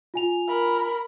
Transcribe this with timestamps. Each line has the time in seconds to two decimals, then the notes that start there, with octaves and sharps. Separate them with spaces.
0.14 F4 G#5 F7
0.48 A#4 B5